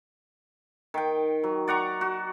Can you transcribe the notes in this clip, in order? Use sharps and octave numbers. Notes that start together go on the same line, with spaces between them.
D#3 G5
F#3
D5 F#5 A#5 C#6
F#4